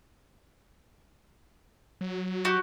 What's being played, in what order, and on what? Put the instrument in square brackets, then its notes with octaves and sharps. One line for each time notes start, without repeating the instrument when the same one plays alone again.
[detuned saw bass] F#3
[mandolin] F#4 G4